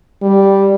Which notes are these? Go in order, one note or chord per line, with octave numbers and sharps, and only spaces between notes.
G3